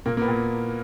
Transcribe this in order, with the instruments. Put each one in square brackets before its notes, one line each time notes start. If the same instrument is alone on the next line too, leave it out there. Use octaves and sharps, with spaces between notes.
[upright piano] A#2 A#3
A#3
B3
A#2